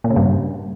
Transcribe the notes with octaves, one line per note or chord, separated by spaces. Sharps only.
A#2
C#3
G2